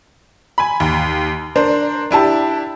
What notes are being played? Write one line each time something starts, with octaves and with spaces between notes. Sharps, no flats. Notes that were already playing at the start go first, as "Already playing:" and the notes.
G#5 B5
D#2
D4 A#4 C5
D4 E4 G4 A5